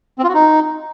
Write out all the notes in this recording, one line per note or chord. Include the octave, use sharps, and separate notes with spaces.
C4
F4
F#4
D#4